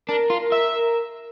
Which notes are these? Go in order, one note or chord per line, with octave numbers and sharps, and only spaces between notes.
D4 A#4
F4
A#4
E5
A#4